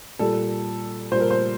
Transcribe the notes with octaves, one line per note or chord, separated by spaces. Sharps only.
A#2 G3 A4
A#2 G3 C5
A#4
C5